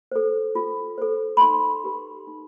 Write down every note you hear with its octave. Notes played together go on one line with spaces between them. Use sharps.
A4 C5
F4
A4 C5
B5
D#4 C6
G4 B4
D#4